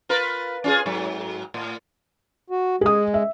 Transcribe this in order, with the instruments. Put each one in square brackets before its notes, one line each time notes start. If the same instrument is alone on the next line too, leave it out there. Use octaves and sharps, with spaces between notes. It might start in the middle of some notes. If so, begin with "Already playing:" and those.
[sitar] F4 A#4 B4
C#4 F4 G#4
G#2 F#3
A2
[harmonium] F#4
[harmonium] G#3 [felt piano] G#4 D#6
[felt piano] E5